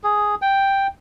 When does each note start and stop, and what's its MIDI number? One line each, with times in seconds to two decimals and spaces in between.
0.04 0.35 68
0.42 0.87 79